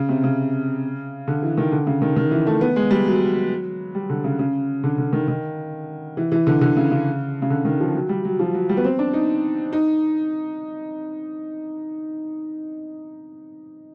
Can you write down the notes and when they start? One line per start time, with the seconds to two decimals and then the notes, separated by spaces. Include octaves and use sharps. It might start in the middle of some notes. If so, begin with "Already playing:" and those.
Already playing: C#3
0.09 C3
0.24 C#3
1.28 D3
1.42 E3
1.57 D#3
1.72 D3
1.87 C#3
2.02 D#3
2.16 D#3
2.31 E3
2.47 A3
2.61 B3
2.76 G#3
2.91 G3
3.06 F#3
3.95 G3
4.10 D3
4.24 C#3
4.39 C#3
4.84 D3
4.98 D3
5.13 D#3
5.28 D#3
6.17 E3
6.32 E3
6.47 D3
6.61 D3
6.76 C#3
6.91 C#3
7.42 C#3
7.50 D3
7.65 D#3
7.80 F3
7.95 F#3
8.09 G3
8.25 F#3
8.39 F3
8.54 F#3
8.69 G3
8.77 B3
8.84 C4
8.99 D4
9.13 D#4
9.73 D#4